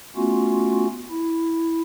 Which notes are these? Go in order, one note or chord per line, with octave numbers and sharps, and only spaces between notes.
A3 B3 C#4 F4 F#4
E4